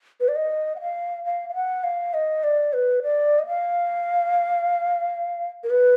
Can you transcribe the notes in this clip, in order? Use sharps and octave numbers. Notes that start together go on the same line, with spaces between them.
B4
D5
D#5
F#5
F5
F5
F5
F#5
F5
D#5
D5
B4
D5
D#5
F5
A#4
B4